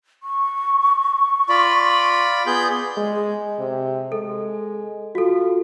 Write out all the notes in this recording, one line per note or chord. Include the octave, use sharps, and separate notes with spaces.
C#6
F4 D5 B5
B3 G#4 G6
G#3
C3
G#3 A4
F4 F#4 A4